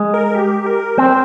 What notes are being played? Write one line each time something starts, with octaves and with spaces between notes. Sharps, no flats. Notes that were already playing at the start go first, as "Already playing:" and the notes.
Already playing: G#3
A#4
G4
A#4
C4 C5